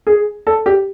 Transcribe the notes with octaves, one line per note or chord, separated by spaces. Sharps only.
G#4
A4
G4